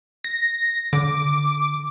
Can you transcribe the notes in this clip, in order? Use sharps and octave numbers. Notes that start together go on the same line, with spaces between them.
A#6
D3 D6